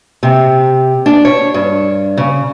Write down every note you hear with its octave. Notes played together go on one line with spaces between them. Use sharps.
C3
D4
C#5
G2
C#3